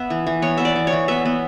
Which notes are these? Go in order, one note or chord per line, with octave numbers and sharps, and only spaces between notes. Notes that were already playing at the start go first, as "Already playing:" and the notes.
Already playing: B3 E5
E3
E3
B3 C#5
B3 E5
D5
E3
C#5
E3
B3 E5
B3